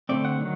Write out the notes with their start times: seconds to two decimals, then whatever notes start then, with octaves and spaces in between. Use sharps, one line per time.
0.09 D3 A3 C4 D5
0.25 F#5
0.40 D#3 F#3